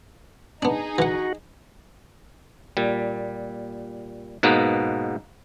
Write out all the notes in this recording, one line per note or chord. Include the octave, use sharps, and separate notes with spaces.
B3 D4 D#4 G#4
E3 F#4 F#5
A#2 G3
G#2 B2 A#3 B3